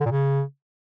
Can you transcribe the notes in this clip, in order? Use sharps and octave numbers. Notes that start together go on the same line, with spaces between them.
D3
A#2
C#3